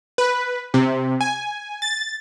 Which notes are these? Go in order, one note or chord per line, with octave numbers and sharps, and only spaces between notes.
B4
C3
G#5
A6